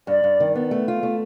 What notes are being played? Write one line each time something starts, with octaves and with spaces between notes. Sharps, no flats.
G2 D5
G2
D#3
B3
A3
F4
A3